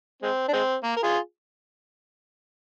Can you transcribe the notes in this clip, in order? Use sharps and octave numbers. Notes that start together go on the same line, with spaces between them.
G#3 C4
D4
G#3 C4
A#3
A#4
F4 G#4